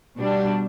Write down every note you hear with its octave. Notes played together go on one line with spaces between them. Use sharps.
B2 G3 D4